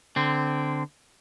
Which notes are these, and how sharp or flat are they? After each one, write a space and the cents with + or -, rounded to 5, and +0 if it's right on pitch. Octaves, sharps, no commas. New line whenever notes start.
D3 +0 C4 -15